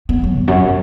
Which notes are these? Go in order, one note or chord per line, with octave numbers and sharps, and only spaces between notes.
B3
F#3
E2
F#2